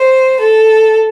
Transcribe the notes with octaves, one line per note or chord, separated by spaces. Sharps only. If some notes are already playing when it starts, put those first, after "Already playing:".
Already playing: C5
A4